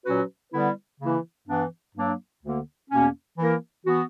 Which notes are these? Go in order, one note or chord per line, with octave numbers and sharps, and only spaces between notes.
A#2 F#3 C#4 F#4 B4
D3 G3 B3 E4 B4
C#3 E3 A#3 E4
G2 E3 B3 D4
G2 F#3 A#3 D4
D2 D3 A#3
E2 B2 A#3 C#4
E3 A#3 E4 A#4
E3 B3 F#4